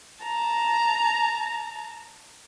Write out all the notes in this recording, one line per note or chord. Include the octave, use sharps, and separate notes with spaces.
A5 A#5